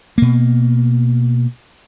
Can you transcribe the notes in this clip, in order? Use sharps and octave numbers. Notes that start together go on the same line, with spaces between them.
B2 A#3